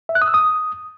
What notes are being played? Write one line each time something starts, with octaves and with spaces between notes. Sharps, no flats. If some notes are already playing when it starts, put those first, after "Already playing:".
E5
F#6
D#6
E6
D#6